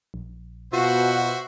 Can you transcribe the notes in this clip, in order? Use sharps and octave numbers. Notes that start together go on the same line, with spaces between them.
A#1
B2 F4 F#4 C5 E5 F#5